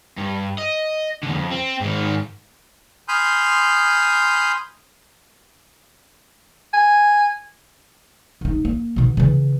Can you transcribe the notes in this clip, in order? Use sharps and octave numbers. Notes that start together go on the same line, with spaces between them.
G2
D#5
E2 D3
F2
C4
G#2 D#3
G#5 B5 C6 D#6 F6 G6
G#5
E1 D#4
A#3
B2 D3
C#3 E3